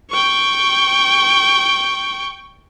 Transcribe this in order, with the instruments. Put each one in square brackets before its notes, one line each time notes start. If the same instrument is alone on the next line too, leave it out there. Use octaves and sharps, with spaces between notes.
[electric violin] G5 C#6